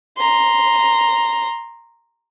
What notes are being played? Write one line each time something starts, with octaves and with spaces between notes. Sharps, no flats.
A#5 C6